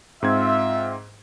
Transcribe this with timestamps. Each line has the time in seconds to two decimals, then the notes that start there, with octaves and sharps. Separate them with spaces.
0.22 G#2 C4 F4 E5 G#6